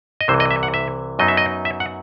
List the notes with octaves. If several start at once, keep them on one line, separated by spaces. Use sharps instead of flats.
D#5
C2 C3 E3 C5
D#5
E5
F#5
E5
F#2 F#3 B3 D#4 D#5
E5
D#5
E5
F#5